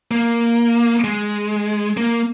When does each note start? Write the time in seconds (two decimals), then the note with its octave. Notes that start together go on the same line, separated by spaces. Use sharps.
0.11 A#3
1.04 G#3
1.97 A#3